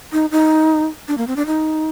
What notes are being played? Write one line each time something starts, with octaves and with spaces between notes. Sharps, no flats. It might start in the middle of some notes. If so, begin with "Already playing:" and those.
D#4
D#4
D4
A#3
C4
D4
D#4